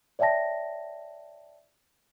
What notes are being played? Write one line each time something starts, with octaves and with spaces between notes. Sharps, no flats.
C#5 D5 E5 G5 A5 A#6